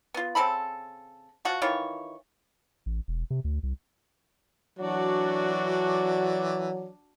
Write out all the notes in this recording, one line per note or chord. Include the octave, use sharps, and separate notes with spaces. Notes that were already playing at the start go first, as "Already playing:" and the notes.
B3 F4
C#3 C4 A4 B5
F3 F#4
D#3 E3 F4 C#5
A1
E1
C3
D2
C2
E3 F#3 D4 F#4 D5